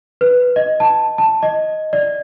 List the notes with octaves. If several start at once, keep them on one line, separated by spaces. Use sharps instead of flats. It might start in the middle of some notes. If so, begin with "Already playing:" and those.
B4
D#5
A5
A5
D#5
D5